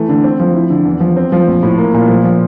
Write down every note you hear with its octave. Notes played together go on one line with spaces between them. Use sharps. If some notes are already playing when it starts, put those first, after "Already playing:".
Already playing: E3 A3
D3
C4
F3
E4
D3
E2
F3
C4
F3
A#1
A2
A#3
A#2
F3
F3